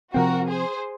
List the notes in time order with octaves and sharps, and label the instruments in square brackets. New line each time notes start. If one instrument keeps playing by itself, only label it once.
[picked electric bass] C3 F3 C4 [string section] F#4 A#4
[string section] G#4 C5